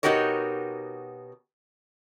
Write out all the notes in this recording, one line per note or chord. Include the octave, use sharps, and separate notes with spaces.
B2 D#4 F#4 G4 A#4 C#5